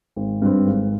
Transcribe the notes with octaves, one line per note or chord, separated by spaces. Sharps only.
G#1
G2 G3 C4
G#1